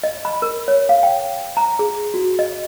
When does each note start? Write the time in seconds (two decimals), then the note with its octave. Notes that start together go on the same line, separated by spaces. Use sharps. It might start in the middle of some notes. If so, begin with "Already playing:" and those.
0.04 D#5
0.25 B5
0.42 A#4
0.68 C#5
0.89 F5
1.03 G5
1.57 A#5
1.79 G#4
2.14 F#4
2.39 D#5